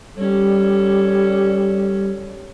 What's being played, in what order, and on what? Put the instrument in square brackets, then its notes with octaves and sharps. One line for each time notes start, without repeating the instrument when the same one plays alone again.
[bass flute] G3 [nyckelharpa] C#4 A4